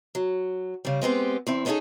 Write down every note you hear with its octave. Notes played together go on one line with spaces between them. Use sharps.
F#3
C#3 G3
G#3 B3 C4 G4
E2 C4 E4
B3 C#4 D#4 E4 G#4 A4